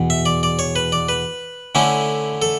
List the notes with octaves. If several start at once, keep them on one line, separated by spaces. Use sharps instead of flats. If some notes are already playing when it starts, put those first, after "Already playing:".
Already playing: E2 B2
E5
D5
D5
C#5
B4
D5
B4
D3 A3 C#4 E4
A4